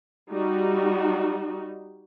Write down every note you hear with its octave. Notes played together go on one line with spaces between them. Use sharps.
G3 D#4 F#4